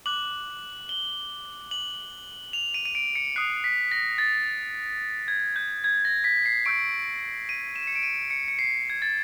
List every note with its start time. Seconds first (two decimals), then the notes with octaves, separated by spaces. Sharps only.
0.06 D6 F#6 F#7
0.89 G7
1.71 F#7
2.53 F7
2.74 D#7
2.85 D#7
2.95 D7
3.15 C#7
3.36 D#6 F#6 C7
3.64 B6
3.92 A#6
4.18 A6
5.28 G#6
5.56 G6
5.84 G#6
6.05 A#6
6.24 B6
6.46 C7
6.66 C#6 E6 G6 D7
7.49 D#7
7.76 E7
7.87 C#7
7.95 D7
8.03 D#7
8.30 C#7
8.48 C#7
8.59 C7
8.90 G#6
9.02 A6